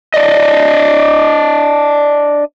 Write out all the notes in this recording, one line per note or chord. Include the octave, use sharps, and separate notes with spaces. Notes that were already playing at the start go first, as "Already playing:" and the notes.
D4 D5 D#5